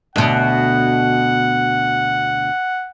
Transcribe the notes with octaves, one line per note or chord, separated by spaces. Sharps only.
D2 B2 F#5